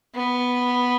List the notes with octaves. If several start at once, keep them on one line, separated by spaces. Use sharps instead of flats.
B3